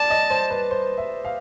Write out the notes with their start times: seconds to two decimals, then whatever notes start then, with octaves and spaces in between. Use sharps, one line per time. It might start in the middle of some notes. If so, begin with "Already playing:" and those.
Already playing: D5 A5
0.10 D#5
0.30 C5
0.50 B4
0.71 C5
0.98 E5
1.25 F5